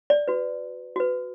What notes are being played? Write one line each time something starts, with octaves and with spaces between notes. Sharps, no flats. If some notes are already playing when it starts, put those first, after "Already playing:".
D5
F#4 B4
F#4 B4